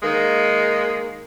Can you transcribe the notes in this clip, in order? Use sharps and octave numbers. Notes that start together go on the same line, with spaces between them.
D#3 G#3 A#3